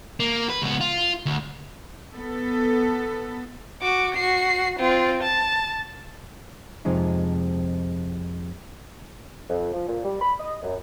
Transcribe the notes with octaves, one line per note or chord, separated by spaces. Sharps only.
A#3
B4
C#2 B3
F4
D2
B3 A4
F#4 D6
F#4 C7
C4 F4
A5
F2 C3 F3 G#3 D#4
F2
F3
A#2
G3
B5
D#5
F#2